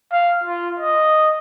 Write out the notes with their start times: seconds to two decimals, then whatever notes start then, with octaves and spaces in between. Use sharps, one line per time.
0.12 F5
0.44 F4
0.80 D#5